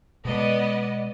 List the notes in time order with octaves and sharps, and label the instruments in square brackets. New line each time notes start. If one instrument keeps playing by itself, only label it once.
[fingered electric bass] B2 G#3 [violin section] B3 D5 D#5